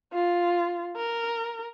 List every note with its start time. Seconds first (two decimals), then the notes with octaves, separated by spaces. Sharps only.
0.13 F4
0.97 A#4